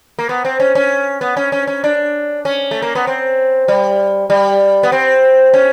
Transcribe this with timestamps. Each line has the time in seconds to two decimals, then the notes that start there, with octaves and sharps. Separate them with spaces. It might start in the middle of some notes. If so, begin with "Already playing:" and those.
0.19 A#3
0.29 B3
0.45 C4
0.60 C#4
0.75 C#4
1.21 B3
1.37 C#4
1.52 C#4
1.67 C#4
1.84 D4
2.45 C#4
2.71 A3
2.82 A#3
2.95 B3
3.07 C4
3.68 G3
4.30 G3
4.83 B3
4.92 C4
5.54 C#4